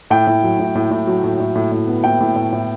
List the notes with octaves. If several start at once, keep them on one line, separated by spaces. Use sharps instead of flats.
A2 G5
A2
F#3
A2
A2
A2
F#3
A2
A2
A2
A2
B3
A2 G5
A2
A2
A2